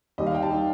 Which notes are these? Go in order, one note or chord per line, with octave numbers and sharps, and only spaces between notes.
D#2 D#3 G3 D#5
F5
G5
A5
D#3 G3